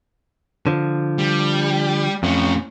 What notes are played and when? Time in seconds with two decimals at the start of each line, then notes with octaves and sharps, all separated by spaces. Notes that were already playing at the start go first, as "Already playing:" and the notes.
0.67 D3 F3
1.18 G3
2.23 F2 A2 C#4